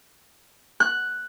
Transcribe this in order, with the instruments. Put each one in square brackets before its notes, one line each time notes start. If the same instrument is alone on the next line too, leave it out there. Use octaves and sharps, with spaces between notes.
[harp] F#6